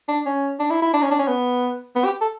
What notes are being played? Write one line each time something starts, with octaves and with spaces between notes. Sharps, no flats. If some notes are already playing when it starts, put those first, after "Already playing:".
D4
C#4
D4
E4
E4
D4
C#4
D4
C#4
B3
B3
G4
A4